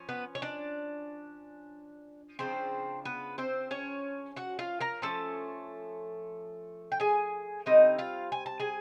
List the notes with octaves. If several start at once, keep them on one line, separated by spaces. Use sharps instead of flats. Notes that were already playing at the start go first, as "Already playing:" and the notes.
Already playing: F3 C#4
B3 B4
C#5
D4 D5
C#3 F3 C4 D4 C5
B3 B4
C4 C5
C#4 C#5
F#4 F#5
F4 F5
A#4 A#5
F3 A3 C#4 A4 A5
G5
G#4 G#5
D3 G3 C4 D#4 D#5
F4 F5
G#5
A5
G#4 G#5